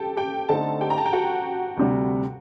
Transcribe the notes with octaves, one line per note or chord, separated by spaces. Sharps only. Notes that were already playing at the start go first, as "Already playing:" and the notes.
Already playing: G4 A4 G5 A5
G4 G5
D3 A3 C4 D#4 A4 A5
G4 G5
A#5
A5
G5
F#4 F#5
D2 C3 G3